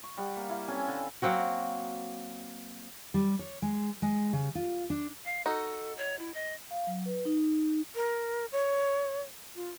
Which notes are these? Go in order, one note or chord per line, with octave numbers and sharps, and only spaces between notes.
C#6
G3 F#5
A#3
E4 F5
C4 C#4 A4 G#5
D3
F#3 A#3 C4 F#4
G3
C#5
G#3
G#3
C#3
F4
D4
F5
D#4 F#4 A4
C#5
E4
D#5
F5
F#3
B4
D#4
A#4
C#5
F4